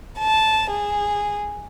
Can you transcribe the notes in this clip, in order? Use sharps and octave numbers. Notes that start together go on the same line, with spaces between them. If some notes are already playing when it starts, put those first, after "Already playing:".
A5
G#4